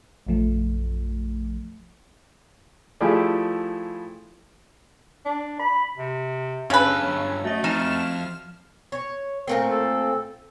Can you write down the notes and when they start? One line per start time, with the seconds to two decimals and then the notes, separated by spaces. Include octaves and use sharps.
0.27 A#1 F#2 F3 A3
3.01 F3 A3 E4 G4 G#4 D5
5.26 D4
5.59 B5
5.97 C3
6.70 G2 C#3 C#4 A4 B4
6.99 F#3
7.44 A3 F#4 D#5
7.64 F2 D#4 F6 E7
8.92 C#5
9.47 A#2 A3 C4 A#4
9.69 A4